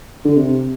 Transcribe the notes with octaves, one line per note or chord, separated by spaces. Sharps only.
D3
C3